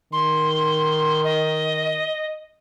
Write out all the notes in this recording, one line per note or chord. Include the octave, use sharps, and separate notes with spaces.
D#3 C6
D#5